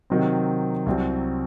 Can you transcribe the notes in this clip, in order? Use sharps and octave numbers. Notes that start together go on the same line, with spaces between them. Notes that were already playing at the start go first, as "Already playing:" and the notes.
C3 D#3 F#3 C4
C2 C3 F#3 C4